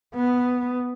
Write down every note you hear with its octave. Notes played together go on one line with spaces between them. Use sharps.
B3